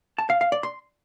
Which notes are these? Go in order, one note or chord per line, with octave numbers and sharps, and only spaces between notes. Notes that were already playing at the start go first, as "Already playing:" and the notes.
A5
F5
F5
D5
C6